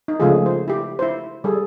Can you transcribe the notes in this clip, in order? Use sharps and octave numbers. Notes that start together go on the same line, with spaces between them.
D#4
C#3 F3 G#3 A3 F4 G#4
C5
E4 G4
E4 C5
G3 G#4 A4